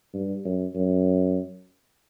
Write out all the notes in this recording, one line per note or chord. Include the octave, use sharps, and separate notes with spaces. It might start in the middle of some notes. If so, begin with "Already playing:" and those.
G2
F#2
F#2